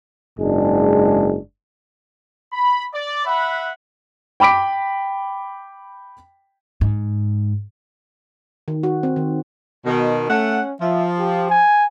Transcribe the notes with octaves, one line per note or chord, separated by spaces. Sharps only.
F#1 G#2 G#3 D4
B5
D5
B4 E5 F#5 B5
G5 B5 D6 B6 D7
G#2
D#3
F#4
C4
D#3
B2 D#3
A3 C#4 F#5
F3 E5
G4
G#5